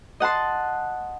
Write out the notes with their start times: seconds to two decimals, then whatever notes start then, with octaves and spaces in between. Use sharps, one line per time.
0.20 D#5 F#5 A5 C6